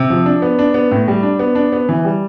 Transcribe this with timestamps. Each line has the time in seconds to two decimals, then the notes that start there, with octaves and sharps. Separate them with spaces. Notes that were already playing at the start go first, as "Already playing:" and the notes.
Already playing: C3
0.10 F3
0.26 D4
0.42 B3
0.59 D4
0.74 B3
0.91 A2
1.08 G3
1.23 D4
1.39 B3
1.55 D4
1.72 B3
1.89 E3
2.05 G3